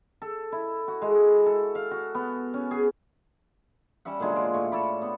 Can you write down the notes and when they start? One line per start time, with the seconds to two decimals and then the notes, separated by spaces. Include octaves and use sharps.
0.22 A4
0.52 E4
0.88 F#4
1.02 G#3
1.46 A4
1.75 F5
1.91 F#4
2.15 B3
2.54 C#4
2.71 G#4
4.05 G3 C#4 E5 F#5
4.20 A#2 D3 F#3 G#3
4.36 F4 D5
4.54 A2 C#5
4.72 A4 C#5 D5 B5
5.02 B3